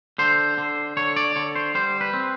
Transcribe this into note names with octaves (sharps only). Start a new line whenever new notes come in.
D3 C5
D3
D3 C#5
D5
D3 C#5
C5
G3 C5
B4
C4